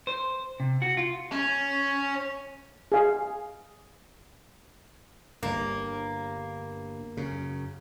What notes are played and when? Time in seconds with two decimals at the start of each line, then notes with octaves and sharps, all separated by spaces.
0.07 C5
0.60 C3
0.82 F#4
0.97 F4
1.32 C#4
2.92 G#4 F5
5.43 G1 G2 A#3
7.17 F#2 C#3